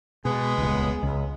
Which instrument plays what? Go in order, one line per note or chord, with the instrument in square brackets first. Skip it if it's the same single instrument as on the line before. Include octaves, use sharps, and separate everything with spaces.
[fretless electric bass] B2 [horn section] G#3 B3
[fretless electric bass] D#1 C#2
C#2